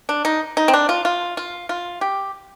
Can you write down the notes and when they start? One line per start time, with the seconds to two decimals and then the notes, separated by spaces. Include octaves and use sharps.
0.09 D4
0.25 D#4
0.57 D#4
0.68 C4
0.73 D4
0.89 F4
1.05 F4
1.37 F4
1.69 F4
2.01 G4